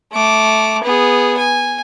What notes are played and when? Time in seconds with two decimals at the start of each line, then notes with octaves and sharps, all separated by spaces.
0.12 A3 D6
0.83 B3 G#4
1.37 G#5